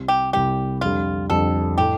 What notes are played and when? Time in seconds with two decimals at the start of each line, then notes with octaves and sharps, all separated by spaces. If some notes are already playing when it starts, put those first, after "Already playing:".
Already playing: C2 C3 G3
0.08 G4
0.33 C2 C3 G3 G4
0.81 F2 D3 G3 F4
1.30 F2 D3 G3 A4
1.78 A2 A3 G4